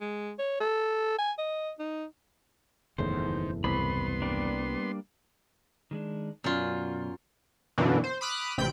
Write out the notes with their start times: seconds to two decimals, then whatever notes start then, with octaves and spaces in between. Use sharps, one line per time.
0.01 G#3
0.39 C#5
0.60 A4
1.19 G#5
1.39 D#5
1.79 D#4
2.98 F#1 E2 A2 D#3 C5
3.64 C2 B3 B5 C6
4.22 G3 A#3 D4
5.91 D#3 G#3 D4
6.44 F#2 B2 F#3 F4 D5
7.78 F#2 B2 D3 E3 A#3 D4
8.04 C5
8.21 B5 D6 D#6 F6 F#6
8.58 A1 C3 G5 B5 G6 D7